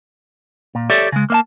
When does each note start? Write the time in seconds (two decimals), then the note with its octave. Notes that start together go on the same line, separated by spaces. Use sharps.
0.75 A#2
0.90 G4 A4 C#5 D5 E5
1.12 C#3 G#3
1.30 A#3 E5 A5